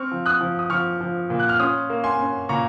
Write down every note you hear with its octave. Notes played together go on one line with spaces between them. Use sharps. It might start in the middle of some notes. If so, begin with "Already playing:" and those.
Already playing: C4 C#6 F6
F3
D#6 F#6
F3
D#6
F3 C#6 F6
F3
A#2
F#6
F6
C#4 C6 D#6
A#3
G#5 C6
C#4
A#2 A#5 C#6